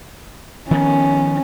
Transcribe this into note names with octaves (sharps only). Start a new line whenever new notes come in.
D#3 F3 B3 C#4